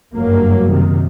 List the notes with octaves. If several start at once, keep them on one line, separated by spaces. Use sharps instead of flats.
F#1 G2 F#3 A#3
F#2 C3 D#3